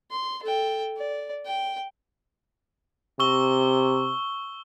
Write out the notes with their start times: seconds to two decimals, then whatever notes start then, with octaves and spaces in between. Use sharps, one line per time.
0.11 C6
0.43 A4 G5
0.97 D5
1.46 G5
3.20 C3 C#6 E6 G7